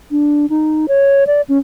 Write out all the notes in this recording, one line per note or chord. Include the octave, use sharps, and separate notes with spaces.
D4
D#4
C#5
D5
C#4